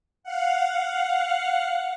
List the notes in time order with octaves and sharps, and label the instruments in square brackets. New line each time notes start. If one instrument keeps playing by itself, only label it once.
[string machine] F5 F#5